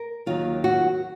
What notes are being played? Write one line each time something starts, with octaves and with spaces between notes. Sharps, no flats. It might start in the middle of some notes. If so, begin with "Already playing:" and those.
Already playing: A#4
D#2 D#3 F#3 F4
F#4